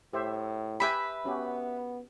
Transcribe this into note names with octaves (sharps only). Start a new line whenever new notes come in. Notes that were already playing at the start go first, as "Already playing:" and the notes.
A2 G4 C5 E5
G4 B4 E5 G5 G#5 B5
B3 C#4 F#4 G4